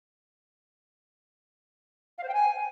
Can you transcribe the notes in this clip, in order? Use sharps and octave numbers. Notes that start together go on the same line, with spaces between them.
F5
C5
G5
G#5